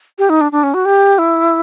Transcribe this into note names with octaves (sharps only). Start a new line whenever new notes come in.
G4
D#4
D4
D4
C#4
F#4
G4
E4